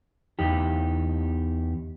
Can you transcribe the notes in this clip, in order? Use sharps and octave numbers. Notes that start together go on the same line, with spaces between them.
E2 D#4 G4